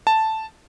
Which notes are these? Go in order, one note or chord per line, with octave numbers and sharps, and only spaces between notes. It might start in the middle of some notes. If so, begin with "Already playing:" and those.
A5